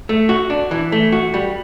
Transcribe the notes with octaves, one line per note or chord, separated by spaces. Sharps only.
A3
F#4
D4
E3
A3
F#4
G3